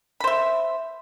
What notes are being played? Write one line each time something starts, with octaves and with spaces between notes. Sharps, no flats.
C5 E5 B5